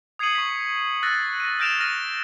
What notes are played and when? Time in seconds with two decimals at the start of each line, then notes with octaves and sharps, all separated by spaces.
0.19 D#6 G#6 C7 C#7 D#7 F#7
0.35 C#6 B6
1.02 E6 F#6 A6 A#6
1.40 A#6 D#7
1.59 F6 G6 A#6 D7 E7 F7
1.80 F6 A#6 D#7